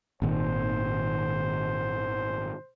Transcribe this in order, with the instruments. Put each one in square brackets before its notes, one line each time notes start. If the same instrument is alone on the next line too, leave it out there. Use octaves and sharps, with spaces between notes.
[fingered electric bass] G#1 A#2 D#3 [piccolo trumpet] C5